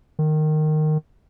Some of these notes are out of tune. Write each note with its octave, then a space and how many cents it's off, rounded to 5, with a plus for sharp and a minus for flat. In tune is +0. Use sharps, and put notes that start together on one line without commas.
D#3 -15